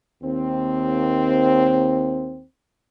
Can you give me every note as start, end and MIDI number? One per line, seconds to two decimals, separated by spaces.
0.23 2.43 39
0.23 2.43 60